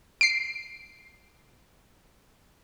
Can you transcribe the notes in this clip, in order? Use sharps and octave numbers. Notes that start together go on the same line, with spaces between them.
C7 D7